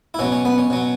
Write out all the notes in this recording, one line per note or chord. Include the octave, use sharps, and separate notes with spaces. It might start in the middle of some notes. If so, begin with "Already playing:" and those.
E4
B2 F#3 C#4
C#4
B3
C#4
B2 F#3